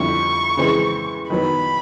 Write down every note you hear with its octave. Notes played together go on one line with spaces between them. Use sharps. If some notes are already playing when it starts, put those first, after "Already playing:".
Already playing: F2 D3 G3 C4 E4 C#6
C#3 E3 G#3 C4
D#3 F#3 B3 B5